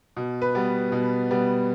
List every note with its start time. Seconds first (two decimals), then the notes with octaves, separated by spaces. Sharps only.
0.17 B2
0.42 B4
0.55 G3 B3
0.92 B2
1.31 G3 B3